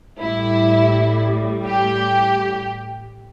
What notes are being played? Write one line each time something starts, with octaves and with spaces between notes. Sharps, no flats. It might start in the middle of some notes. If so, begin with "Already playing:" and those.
A1 A2 G3 E4
G4